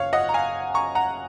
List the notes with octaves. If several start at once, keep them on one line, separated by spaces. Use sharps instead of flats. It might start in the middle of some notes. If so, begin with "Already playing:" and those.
Already playing: F#1 C#5 F5
D#5 F#5
A#5
F5 G#5
A#5 C#6
F#5 A#5